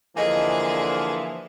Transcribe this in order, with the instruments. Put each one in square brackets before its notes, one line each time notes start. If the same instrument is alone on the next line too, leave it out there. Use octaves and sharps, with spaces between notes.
[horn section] D3 A#3 [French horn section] E3 F3 [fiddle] G#4 [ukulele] A4 D#5 G#5